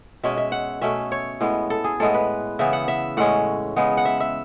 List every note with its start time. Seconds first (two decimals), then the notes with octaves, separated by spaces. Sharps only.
0.23 B2 G#3 C#4 E5
0.37 E5
0.52 F#5
0.82 B2 A3 C#4 E5
1.12 C#5
1.40 A2 G#3 B3
1.70 A4
1.84 G#4
2.00 A2 G#3 B3 A4
2.14 B4
2.59 C#3 E3 B3 E5
2.73 F#5
2.88 E5
3.17 A2 G#3 C#4 F#5
3.76 C#3 G#3 B3
3.97 F#5
4.05 E5
4.20 E5